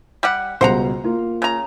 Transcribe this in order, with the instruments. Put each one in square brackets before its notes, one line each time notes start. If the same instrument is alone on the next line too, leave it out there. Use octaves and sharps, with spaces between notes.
[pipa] G3 G4 F#5
[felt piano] C#2 B2 G3 [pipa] C5 F#5 A#5
[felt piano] A#3 F4
[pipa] C#3 A#5